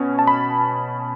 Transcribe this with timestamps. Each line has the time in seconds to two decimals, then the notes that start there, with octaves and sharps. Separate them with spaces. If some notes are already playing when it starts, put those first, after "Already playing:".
Already playing: B2 C#4
0.19 A5
0.27 B5